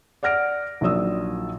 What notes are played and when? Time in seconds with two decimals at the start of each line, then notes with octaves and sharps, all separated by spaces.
0.23 D5 F#5 F6 A#6 D7
0.81 A#1 D#3 F#3 D5 D#6 E6